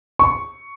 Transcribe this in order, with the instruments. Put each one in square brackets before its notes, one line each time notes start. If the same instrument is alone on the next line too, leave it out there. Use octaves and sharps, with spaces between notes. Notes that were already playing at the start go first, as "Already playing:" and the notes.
[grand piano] C#6